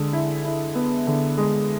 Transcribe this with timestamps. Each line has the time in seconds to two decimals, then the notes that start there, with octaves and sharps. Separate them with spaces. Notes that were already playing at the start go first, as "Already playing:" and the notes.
Already playing: D3 G#3
0.13 E4
0.44 E4
0.75 B3
1.07 D3
1.37 G#3